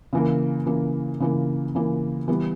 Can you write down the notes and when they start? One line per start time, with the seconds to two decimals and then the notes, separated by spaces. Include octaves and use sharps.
0.13 C#3 E3 A#3
0.66 C#3 E3 A#3
1.20 C#3 E3 A#3
1.75 C#3 E3 A#3
2.28 E3 G3 B3